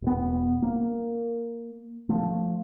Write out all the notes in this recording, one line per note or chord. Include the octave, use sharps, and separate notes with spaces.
E1 B3
A#3
F3 A3